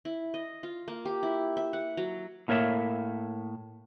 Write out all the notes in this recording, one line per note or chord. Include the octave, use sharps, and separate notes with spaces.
E4
D#5
F4
A#3
G4
E4
E5
F#5
F#3
A2 A#3 A#4 C#5 E5